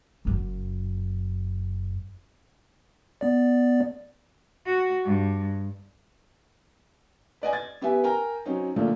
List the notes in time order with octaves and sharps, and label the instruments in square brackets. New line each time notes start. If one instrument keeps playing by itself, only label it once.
[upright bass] F#1 F#2
[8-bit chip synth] B3 D5
[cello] F#4
G2
[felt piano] B4 D5 D#5 G#5
G#6 A6
B3 G4 B4 E5 G#5
A#4 G5 G#5 A#5
F#3 C4 C#4 D#4
A#2 D3 F3 A3 A#3